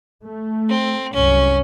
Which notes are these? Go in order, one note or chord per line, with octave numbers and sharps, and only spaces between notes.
A3
C4
C2 F#2 C#4